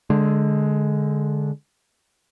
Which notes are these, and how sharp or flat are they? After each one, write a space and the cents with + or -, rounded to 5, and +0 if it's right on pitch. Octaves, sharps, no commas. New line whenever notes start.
D3 +0 G#3 +15